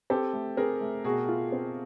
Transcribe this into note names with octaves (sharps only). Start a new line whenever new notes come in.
C4 G4 A4
A3
C4 G#4 A#4
A3
B2 F#4 G#4
F4
C4